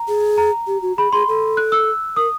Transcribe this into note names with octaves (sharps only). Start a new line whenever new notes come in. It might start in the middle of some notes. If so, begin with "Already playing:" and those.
Already playing: A#5
G#4
A#5
G4
F#4
G#4 B5
G#4 C6
A4
F#6
E6
A#4 D#6